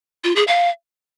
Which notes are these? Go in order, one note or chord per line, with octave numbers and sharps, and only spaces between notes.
F4
G#4
F5